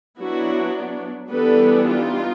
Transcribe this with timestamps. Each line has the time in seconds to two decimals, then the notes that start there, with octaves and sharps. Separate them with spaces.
0.19 F#3 B3 D4 E4 F#4
1.31 E3 G3 B3 D4 A4 B4
1.87 D#4 F4